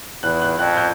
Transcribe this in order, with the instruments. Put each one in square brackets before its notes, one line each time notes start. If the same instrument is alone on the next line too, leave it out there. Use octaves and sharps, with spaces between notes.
[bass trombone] E2 [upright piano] F#6
[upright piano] F#6
[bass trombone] F2 [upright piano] F#6
[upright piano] G6